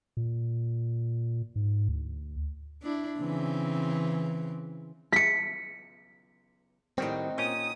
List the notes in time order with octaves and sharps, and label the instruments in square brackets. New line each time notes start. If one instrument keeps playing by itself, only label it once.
[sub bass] A#2
G#2
D2
[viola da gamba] D4 E4
C#3 E3 C4
[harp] B6 C#7
[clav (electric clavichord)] A2 D#3 G3 [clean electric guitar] C4 [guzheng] D#4 F#4
[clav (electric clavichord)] A#2 C#4 G5 [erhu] D#6